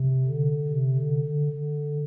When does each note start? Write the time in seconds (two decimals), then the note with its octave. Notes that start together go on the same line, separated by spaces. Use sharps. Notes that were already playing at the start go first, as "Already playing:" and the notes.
Already playing: C3
0.25 D3
0.68 C3
0.96 D3
1.25 D3
1.52 D3